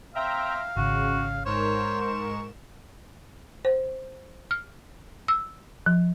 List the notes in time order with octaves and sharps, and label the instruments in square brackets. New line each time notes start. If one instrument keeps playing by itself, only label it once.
[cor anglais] C4 [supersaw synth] E5 G5 A#5 [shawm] F5
[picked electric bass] G#1 [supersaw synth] C#3 [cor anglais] F#4
[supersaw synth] G#2 A#4 E7 [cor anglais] C5 [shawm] C#5
[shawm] C#6
[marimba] C5
F6
E6
F3